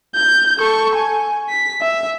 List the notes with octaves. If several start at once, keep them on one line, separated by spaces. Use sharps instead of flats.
G6
A4 C#6
G#5
B6
E5